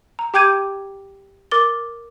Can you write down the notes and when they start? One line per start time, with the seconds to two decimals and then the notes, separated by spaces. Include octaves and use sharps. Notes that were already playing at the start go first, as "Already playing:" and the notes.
0.19 A#5
0.34 G4 G5 D6 G6 G#6 D#7
1.51 A#4 D6 A6 G7